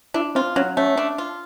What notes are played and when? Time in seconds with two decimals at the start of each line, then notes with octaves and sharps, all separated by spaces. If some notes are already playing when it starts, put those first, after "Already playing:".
0.14 D4 E4
0.35 C4 F4
0.56 F#3 C#4
0.77 A3 C#4
0.97 D4
1.18 F4